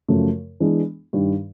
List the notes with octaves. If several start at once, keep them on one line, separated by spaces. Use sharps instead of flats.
F#2 C#3 F3 A3
E3 G#3 B3 D4
G2 D#3 G3